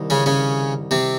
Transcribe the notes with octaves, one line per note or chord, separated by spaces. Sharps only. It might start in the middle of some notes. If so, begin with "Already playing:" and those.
Already playing: C2 D#3
C#3 C#4
C#3 C#4
C3 C4